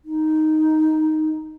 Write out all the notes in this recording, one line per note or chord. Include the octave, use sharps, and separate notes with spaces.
D#4